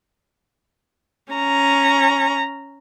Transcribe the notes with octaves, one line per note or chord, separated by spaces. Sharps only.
C#4 A#5